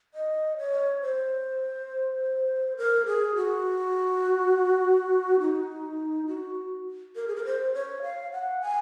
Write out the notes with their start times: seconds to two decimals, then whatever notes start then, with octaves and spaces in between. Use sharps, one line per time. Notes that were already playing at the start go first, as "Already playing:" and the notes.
0.14 D#5
0.58 C#5
1.02 C5
2.77 A#4
3.06 G#4
3.36 F#4
5.40 D#4
6.27 F#4
7.16 A#4
7.28 G#4
7.36 A#4
7.45 C5
7.74 C#5
8.03 F5
8.32 F#5
8.61 G#5